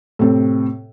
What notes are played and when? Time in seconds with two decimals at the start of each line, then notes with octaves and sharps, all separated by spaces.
0.19 A2 C3 C4 A4